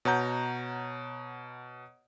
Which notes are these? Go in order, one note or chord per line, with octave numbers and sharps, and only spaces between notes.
B2 C#5 F#5 A#5 G6